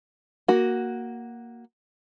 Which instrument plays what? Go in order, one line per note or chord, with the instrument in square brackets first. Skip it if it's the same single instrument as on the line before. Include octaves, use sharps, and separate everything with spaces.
[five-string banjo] A#3 F#4